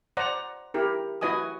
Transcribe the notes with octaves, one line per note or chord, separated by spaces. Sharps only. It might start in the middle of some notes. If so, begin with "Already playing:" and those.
C5 D5 F#5 A#5
E4 G4 A#4
E4 F#4 B4 D#5 G#5 D#6